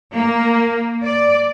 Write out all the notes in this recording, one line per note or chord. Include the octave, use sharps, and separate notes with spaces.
A#3
D5